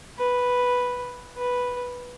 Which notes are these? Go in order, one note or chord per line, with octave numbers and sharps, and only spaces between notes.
B4
B4